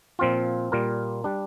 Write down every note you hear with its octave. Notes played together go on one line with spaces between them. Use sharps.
A#2 F3 C4 F4
A#2 G3 A#3 F4 A#4
G3 D4